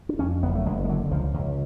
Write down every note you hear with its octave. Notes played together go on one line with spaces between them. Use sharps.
D4
F2 C#4
F#1 B3
A3
F#1 G#3
G#3
D3 F#3
C#2 F3
C#2